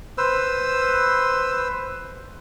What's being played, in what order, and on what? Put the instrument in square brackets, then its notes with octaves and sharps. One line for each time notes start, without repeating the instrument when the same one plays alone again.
[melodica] B4 C5 E6